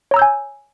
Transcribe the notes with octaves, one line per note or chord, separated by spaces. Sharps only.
C#5 G#5 A#5 E6 G6